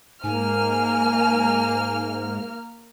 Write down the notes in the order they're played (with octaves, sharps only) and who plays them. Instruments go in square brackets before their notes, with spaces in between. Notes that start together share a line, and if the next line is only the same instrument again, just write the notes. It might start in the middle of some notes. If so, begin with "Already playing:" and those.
[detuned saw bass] G#2 [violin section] A#3 F6 [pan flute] G#5